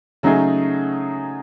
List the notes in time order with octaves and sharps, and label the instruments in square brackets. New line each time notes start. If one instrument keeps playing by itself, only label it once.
[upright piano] C#3 [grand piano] F#3 A3 D#4 G#4